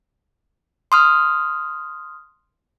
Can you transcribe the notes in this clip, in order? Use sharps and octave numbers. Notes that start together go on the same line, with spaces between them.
C6 D#6 F6